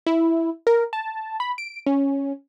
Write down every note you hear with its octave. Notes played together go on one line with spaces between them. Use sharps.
E4
A#4
A5
B5
D7
C#4